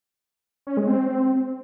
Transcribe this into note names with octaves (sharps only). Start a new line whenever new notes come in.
C#4
G#3
C4